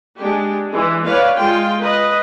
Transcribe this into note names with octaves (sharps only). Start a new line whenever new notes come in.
G#3 D4 G4
E3 G#3
B4 C#5 D5 F5
G#3 F4 G5
B4 D#5